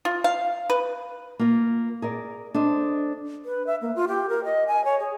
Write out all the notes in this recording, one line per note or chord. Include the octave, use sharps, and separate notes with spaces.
F4
F5
B4
A#3 F4
G#4 A#4 D5
D4 A4 C5 D#5
B4
E5
A#3
F4
G4
A#4
D#5
G#5
C#5
G#4